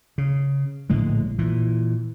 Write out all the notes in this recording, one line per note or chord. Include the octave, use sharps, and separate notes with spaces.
C#3
A#1 A2 D3 G#3
A#2 E3